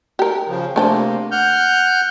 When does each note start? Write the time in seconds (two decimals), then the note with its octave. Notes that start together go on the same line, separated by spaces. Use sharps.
0.19 G4 A#4
0.48 C#3 F3
0.76 C3 A3 A#3 D4 C5
1.32 F#5 F6 G6